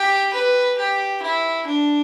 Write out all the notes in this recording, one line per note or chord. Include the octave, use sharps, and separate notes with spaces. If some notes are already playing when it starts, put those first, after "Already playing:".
Already playing: G4
B4
G4
E4
D4